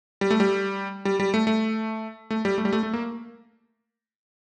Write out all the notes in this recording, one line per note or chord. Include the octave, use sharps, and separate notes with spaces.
G3
A3
G3
G3
G3
A3
A3
A3
G3
A3
G3
A3
A3
A#3